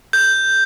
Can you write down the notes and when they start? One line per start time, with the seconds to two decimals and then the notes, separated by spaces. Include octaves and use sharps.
0.13 G6